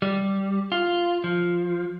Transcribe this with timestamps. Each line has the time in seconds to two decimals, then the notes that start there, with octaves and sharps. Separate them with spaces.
0.02 G3
0.72 F4
1.24 F3